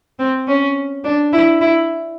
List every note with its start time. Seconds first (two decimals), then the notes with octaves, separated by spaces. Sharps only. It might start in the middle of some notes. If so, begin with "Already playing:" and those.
0.19 C4
0.48 C#4
1.04 D4
1.33 E4
1.61 E4